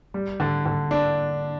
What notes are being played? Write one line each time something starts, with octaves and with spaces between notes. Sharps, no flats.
G3
D3
D3
D4